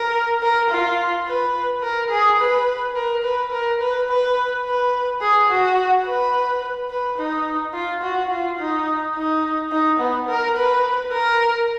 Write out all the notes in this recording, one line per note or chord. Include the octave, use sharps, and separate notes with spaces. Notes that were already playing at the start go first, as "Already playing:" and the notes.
Already playing: A#4
A#4
F4
B4
A#4
G#4
B4
A#4
B4
A#4
B4
B4
B4
G#4
F#4
B4
B4
D#4
F4
F#4
F4
D#4
D#4
D#4
B3
A#4
B4
A#4